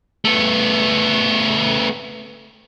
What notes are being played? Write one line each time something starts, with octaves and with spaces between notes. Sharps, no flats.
A3 B3